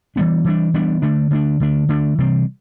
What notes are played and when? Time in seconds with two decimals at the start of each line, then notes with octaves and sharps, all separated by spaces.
0.16 E3 G3 B3 D4
0.45 E3 G3 B3 D4
0.74 E3 G3 B3 D4
1.02 D3 A3 D4
1.31 D3 A3 D4
1.60 D3 A3 D4
1.89 D3 A3 D4
2.18 C3 E3 G3 C4